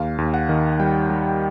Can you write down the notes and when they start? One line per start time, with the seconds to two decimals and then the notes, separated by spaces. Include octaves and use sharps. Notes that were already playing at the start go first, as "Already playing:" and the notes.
Already playing: D#2 F5
0.18 D#2
0.34 F#5
0.49 D#3
0.80 G3 G5
1.10 G3